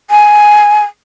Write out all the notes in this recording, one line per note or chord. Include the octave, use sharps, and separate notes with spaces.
G#5